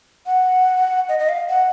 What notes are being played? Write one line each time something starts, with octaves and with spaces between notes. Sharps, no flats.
F#5
D#5
D#5
F5
F#5